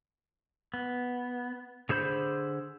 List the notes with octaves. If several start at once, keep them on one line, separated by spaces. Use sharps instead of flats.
B3
D3 G#4 C5 B5 G6